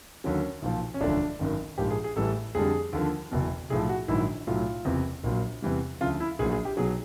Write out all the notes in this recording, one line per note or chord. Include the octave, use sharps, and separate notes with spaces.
D#2 D3 F#3 C#4
B1 A#2 F3
C#4
E1 D2 D3 F3 D4
G#1 F#2 D#3
A#1 G#2 F3 G4
G#4
G#4
A1 A2 E3 G3 A4
F2 D3 G3 G#4
D#2 D3 F3
F#1 E2 B2
B1 A2 F3 G#4
F#4
A#1 G#2 D#3 F#3 E4
B1 A2 F#3 F4
F#1 E2 C3
A#1 A#2 F#3
E2 C3 E3 G3
D2 C#3 F3 F4
E4
A#1 A#2 F#3 G#4
G#4
G4
B1 B2 F#3 G#4